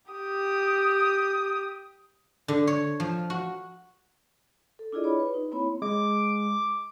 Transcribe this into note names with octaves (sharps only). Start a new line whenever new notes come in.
G4 D#6
D3
C#5
F3
F#4
A4
D4 E4 F4 G#4 D5 D#5
C#5 B5
B4
D#4
A#3 C4 E4 C#5 B5
G#3 D6